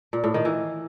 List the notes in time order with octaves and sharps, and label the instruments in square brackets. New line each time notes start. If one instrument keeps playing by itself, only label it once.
[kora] A#2
A2
D#3
E3